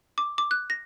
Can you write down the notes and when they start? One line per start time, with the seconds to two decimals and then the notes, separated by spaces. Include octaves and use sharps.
0.18 D6
0.38 D6
0.51 F#6
0.70 A#6